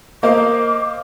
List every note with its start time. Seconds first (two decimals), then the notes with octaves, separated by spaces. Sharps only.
0.23 A#3 C5 D#5 F5 D6